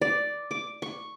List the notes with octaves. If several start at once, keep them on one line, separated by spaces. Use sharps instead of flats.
D5
D6
C#6